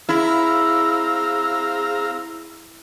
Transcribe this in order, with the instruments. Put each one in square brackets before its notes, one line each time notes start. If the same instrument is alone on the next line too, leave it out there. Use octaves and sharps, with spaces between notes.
[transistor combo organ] C4 F5 A#5 [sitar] E4 [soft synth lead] G#4 [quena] E6